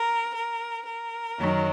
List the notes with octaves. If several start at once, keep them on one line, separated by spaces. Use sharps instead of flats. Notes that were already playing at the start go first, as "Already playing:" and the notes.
Already playing: A#4
A#4
A#4
F#2 D#3 F#3